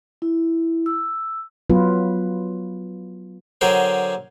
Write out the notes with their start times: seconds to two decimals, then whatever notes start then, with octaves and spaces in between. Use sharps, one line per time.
0.22 E4
0.86 E6
1.70 F#3 B3 F4 B4
3.61 D3 F#3 G#4 A#4 C5 G5